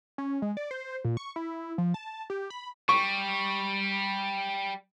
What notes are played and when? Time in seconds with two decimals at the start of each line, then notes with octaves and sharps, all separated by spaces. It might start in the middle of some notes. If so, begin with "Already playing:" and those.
0.18 C#4
0.42 G#3
0.57 D5
0.71 C5
1.05 A#2
1.17 C#6
1.36 E4
1.78 F3
1.94 A5
2.30 G4
2.50 B5
2.89 G3 C#6